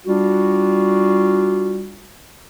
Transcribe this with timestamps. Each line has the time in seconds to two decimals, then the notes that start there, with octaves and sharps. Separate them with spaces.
0.06 G3 D4 F4 F#4